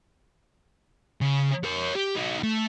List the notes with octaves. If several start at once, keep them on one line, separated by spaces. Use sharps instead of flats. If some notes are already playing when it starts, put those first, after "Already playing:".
C#3
A#4 C#5
G4
D#4 F#4
A3